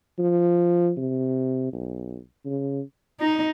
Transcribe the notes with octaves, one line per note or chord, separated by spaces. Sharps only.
F3
C3
B1
C#3
D#4